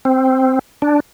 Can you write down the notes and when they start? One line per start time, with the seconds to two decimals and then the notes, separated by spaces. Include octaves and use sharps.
0.05 C4
0.82 D4